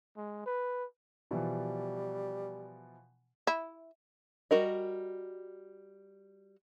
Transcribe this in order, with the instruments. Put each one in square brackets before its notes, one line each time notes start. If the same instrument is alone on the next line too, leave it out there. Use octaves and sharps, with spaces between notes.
[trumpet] G#3
B4
[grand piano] B2 E3 F3 [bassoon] G3
[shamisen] E4
[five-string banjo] G3 F#4 A#4 D#5